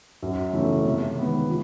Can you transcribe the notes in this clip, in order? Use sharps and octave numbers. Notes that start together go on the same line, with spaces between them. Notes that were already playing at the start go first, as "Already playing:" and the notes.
F#2
C#3 E3 A3
C3
D#3 G#3 B3
F3